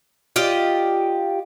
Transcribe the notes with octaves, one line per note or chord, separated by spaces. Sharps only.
F4 G4 D5 D#5